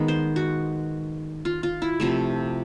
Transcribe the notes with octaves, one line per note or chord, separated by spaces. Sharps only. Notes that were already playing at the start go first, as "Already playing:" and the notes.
Already playing: D#3 G#3 B3
C5
F#4
F4
F4
E4
C3 F3 A3